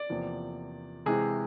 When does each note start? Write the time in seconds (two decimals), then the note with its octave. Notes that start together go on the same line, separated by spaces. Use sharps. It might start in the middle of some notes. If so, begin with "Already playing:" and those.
Already playing: D5
0.09 E2 C3 F3 A#3
1.06 C3 E3 G#3 G#4